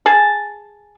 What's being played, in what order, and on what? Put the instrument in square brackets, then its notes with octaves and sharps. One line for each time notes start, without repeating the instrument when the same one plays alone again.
[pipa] G#4 A5